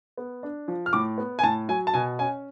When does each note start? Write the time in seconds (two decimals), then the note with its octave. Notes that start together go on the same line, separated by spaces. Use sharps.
0.17 B3
0.43 D4
0.68 F3
0.86 F6
0.93 A2 D6
1.18 B3
1.39 G#5
1.43 A2 A5
1.69 F#3 G#5
1.87 A5
1.94 B2 G#5
2.19 C#4 G#5